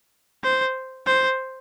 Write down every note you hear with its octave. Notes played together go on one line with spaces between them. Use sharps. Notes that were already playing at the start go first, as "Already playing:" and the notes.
C5
C5